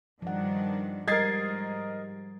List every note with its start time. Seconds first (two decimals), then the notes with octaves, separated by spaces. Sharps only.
0.22 G2 D#3 F3 D4 F#5
1.08 G#2 G3 A#4 D#5 G#6 A6 C7